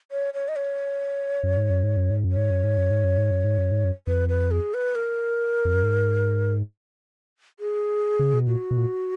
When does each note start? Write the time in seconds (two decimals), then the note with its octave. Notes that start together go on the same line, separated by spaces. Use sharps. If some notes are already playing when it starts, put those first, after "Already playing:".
0.11 C#5
0.34 C#5
0.48 D#5
0.56 C#5
1.43 F#2
1.57 G#2
1.70 F#2
1.83 G#2
1.97 F#2
2.10 G#2
2.24 F#2
2.31 C#5
2.37 G#2
2.51 F#2
2.64 G#2
2.78 F#2
2.91 G#2
3.04 F#2
3.18 G#2
3.31 F#2
3.44 G#2
3.58 F#2
3.71 G#2
3.85 F#2
4.07 F2 B4
4.29 B4
4.51 G#4
4.74 B4
4.95 A#4
5.65 F2
5.74 F#2
5.83 G#2
7.59 G#4
8.19 C#3
8.34 B2
8.47 A#2 F#4
8.71 B2
8.77 A#2